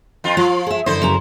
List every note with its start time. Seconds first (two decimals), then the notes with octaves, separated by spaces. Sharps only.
0.24 F2 F4
0.37 F3 F4
0.66 G#4 E5
0.86 F#2 D3 E4 C5 D#5
1.02 F#2 C#3 A#5